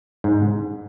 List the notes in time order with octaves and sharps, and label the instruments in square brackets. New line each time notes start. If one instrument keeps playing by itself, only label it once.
[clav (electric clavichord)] G#2